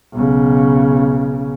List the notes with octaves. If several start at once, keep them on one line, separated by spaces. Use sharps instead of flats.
B1 C#3